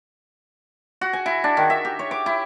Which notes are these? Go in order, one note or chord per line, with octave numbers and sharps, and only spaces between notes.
F#4
G#5
E4
D4
D#3
E5
G4
C#5
D6
E4